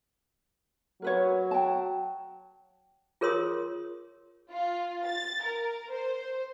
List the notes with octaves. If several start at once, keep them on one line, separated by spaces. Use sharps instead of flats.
F#3 A#4 B4 C#5
G5 A5
F4 G#4 A#4 C#5 C6 D#6
F4
A6
A#4
C5